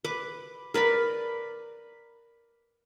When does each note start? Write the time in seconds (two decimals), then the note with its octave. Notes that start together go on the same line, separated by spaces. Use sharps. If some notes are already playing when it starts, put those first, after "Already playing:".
0.04 B4 D6
0.74 A#4 B4 D5 B5